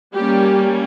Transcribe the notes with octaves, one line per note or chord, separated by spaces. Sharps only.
G3 A#3 C#4 G4